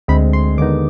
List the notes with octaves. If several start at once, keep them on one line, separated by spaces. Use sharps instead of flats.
D2 D3 G#3 C4 B5
C6
D#2 D3 G#3 B3 D#4 D6